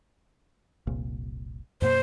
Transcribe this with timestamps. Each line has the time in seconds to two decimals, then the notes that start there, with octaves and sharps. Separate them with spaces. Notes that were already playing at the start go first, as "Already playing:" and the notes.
0.87 F1 C2 A#2
1.82 F#2 B2 A#3 C5